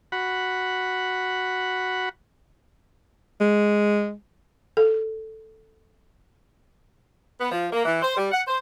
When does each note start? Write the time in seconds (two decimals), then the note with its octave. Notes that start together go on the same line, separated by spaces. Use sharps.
0.12 F#4 F#5 B5
3.41 G#3
4.77 A4
7.39 B3
7.51 F3
7.72 A#3
7.85 E3
8.02 C5
8.17 G3
8.31 F#5
8.47 C5